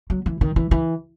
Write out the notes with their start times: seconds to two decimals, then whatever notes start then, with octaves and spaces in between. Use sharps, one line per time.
0.10 F#3
0.26 E3
0.41 D#3
0.56 E3
0.71 E3